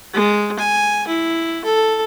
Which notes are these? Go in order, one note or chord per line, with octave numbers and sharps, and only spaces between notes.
G#3
G#5
E4
A4